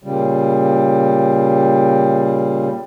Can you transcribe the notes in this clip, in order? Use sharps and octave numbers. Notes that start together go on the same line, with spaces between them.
A#2 C#3 G3